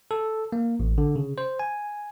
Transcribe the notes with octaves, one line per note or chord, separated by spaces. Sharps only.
A4
A#3
A1
D3
C#3
C5
G#5